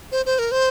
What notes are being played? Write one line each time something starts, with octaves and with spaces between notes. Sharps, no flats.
C5
C5
A#4
C5